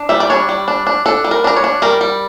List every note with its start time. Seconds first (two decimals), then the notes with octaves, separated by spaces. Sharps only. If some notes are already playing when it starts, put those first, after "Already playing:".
Already playing: D4
0.09 G3 E5
0.20 D5
0.30 D4 C#5
0.49 G3
0.68 D4
0.87 D4
1.06 D4 A4
1.24 G3
1.31 A#4
1.44 D4 A#4
1.57 C#5
1.64 D4
1.82 G3 A#4
2.01 G3